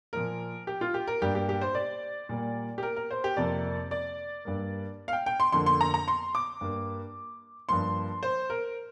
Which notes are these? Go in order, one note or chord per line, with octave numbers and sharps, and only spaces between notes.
A#2 F3 A#3 A#4
G4
F4
G4
A#4
G2 G3 A#3 G4
G4
G4
C5
D5
A#2 G3 A#3
G4
A#4
A#4
C5
G4
F2 C3 A#3 D5
D5
G2 G3 A#3
F5
G5
G5
C6
F2 D3 A#3 C6
C6
A#5
A#5
C6
D6
G2 G3 A#3
G2 F3 A#3 C6
C5
A#4